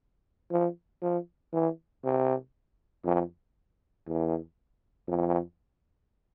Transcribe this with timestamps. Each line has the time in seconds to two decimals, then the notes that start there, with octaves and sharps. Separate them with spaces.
0.51 F3
1.02 F3
1.53 E3
2.04 C3
3.05 F2
4.07 E2
5.08 F2